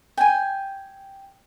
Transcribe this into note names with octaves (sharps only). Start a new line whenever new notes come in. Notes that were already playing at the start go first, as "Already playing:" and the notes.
G5 G#5